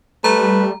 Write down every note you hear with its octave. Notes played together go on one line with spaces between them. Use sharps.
G3 A3 B4 A#5